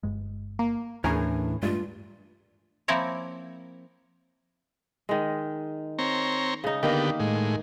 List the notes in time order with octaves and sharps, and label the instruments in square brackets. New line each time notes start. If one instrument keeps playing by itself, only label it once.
[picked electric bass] G1 G2 G#3
[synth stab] A#3
[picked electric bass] D#2 [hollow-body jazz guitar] A2 E3 [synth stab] C#4 G#4 A#4 [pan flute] D4
[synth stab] G2 [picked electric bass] G#3 A3 [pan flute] F4
[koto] F3 A#3 C4 E4 A#4 C#5
[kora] D#3 G#3
[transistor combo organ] C4 C#5 A#5
[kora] C#3 D#4
[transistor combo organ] D3 B3 G4 [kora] D#3 A#3 D#5
[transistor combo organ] A2 G#3